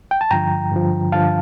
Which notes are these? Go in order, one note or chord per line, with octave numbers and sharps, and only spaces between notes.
G5
A5
G2 D3 F3 G5 A#5
G2 D3 F3
G2 D3 F3 F5 A5